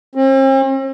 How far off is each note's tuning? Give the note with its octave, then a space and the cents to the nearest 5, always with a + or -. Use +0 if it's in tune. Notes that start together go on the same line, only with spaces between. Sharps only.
C4 +45